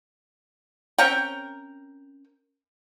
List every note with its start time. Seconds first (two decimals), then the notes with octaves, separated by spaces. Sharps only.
0.98 C4 C#4 A#4 G5